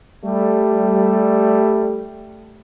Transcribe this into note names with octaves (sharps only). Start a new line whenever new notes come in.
G3 A3